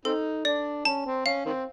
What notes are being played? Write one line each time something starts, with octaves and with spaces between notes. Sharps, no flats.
C4 D#4 A4
D4 D5
C#4 A5
C4
C#4 F5
D#3 C4